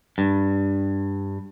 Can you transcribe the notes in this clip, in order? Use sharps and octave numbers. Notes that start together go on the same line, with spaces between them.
G2